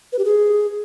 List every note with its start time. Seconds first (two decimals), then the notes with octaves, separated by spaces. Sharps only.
0.12 B4
0.19 G4
0.25 G#4